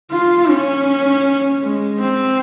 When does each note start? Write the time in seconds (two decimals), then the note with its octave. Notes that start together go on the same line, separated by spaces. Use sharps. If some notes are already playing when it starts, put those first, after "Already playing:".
0.12 F4
0.50 C#4
1.63 G#3
2.01 C4